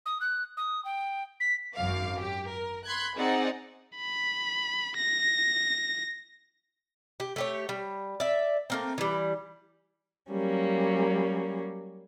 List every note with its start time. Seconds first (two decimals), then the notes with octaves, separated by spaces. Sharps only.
0.06 D#6
0.21 F#6
0.57 D#6
0.85 G5
1.40 B6
1.75 G#1 F#2 F#3 F5 D6
2.21 G4
2.50 A#4
2.85 B5 C6 F#6 G#6
3.17 C4 D#4 G#4 D5 F#5
3.96 B5
4.97 A#6
7.20 G4
7.36 A3 G4 C#5
7.69 G3
8.20 D5 E5
8.70 A3 A#3 C4
8.98 E3 G3
10.30 F#3 G3 A#3 C#4